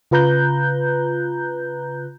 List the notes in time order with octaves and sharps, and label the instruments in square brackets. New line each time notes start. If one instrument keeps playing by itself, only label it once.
[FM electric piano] C#3 F4 B4 A#5 F#6 G6